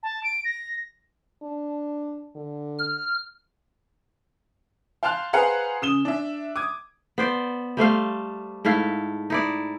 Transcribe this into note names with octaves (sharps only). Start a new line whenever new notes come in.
A5
D7
A#6
D4
D3
F6
F5 G5 A5 C6 F6 F#6
G#4 B4 C5 F5 F#5 A#5
C#3 D#6 E7 G7
D4 E5
D6 D#6 G#6
B3 C5 D5
G3 A3 C5 F5
G#2 A3 E4 F5
D#4 E4 D5